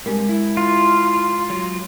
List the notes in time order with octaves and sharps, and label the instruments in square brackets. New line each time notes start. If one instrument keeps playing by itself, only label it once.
[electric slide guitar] G2 C3 [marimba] G#3 A#4
[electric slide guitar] E4
[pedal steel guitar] F4
[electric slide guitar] F#3